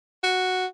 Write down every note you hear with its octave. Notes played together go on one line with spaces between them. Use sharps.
F#4